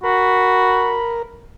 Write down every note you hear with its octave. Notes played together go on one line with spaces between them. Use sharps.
F#4 A#4 B5